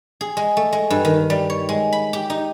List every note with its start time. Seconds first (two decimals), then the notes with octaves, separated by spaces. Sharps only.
0.21 G#4
0.37 G#3
0.57 A3
0.72 G#3
0.90 G2
1.05 D#3
1.30 G3
1.50 C#5
1.69 G#3
1.93 B5
2.13 G4
2.30 D#4